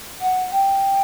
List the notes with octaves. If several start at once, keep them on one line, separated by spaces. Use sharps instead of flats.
F#5
G5